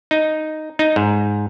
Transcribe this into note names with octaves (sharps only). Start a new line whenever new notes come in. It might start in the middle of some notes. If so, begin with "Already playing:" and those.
D#4
D#4
G#2